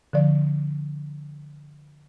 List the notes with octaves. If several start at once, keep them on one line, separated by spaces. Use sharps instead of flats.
D3 F3 D5